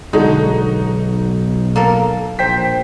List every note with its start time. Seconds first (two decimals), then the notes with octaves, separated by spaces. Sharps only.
0.13 B1 D3 G#3 D#4 F#4
1.76 A#3 A4 A#4
2.39 A#1 C5 G5 B6